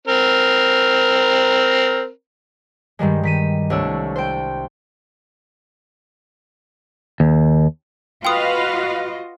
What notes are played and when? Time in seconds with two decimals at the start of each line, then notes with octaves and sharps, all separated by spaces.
0.08 C4 A#4
2.99 G2 D#3 G3 G#3
3.23 D#3 B6 D#7
3.70 C2 A3 D4 C#5 E6
4.16 C5 G5
7.20 D#2
8.25 F4 F#4 B4 D#5 F5 G5 C6 D#6